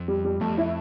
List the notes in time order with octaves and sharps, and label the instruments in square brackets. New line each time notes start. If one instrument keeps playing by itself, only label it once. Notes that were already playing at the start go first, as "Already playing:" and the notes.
Already playing: [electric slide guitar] F2
[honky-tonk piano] G3
G3
[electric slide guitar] F2 [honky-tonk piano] A3
[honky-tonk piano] E4